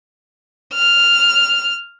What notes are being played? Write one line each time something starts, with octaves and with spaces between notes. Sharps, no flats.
F6